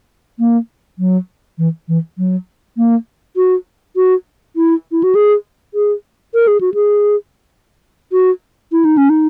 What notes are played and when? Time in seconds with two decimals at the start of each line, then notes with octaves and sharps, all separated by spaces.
0.39 A#3
0.99 F#3
1.58 E3
1.88 E3
2.18 F#3
2.77 A#3
3.36 F#4
3.96 F#4
4.56 E4
4.92 E4
5.03 F#4
5.15 G#4
5.74 G#4
6.34 A#4
6.47 G#4
6.60 F#4
6.74 G#4
8.12 F#4
8.72 E4
8.85 D#4
8.97 C#4
9.09 D#4